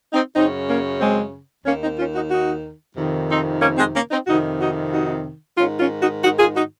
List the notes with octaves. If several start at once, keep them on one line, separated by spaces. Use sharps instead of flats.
C4 D#4
F#2 C#3 C4 D#4
A#3 C#4
G#3 C4
D#2 D#3 A#3 C#4
C4 D#4
C#4 F4
D#4 F#4
D#4 F#4
F2 C3 D#3
C4 D#4
A#3 C#4
G#3 C4
A#3 C#4
C4 D#4
F2 C3 D#3 D#4 F#4
D#4 F#4
D#4 F#4
G#2 D#3 C#4 F4
C#4 F4
D#4 F#4
D#4 F#4
F4 G#4
D#4 F#4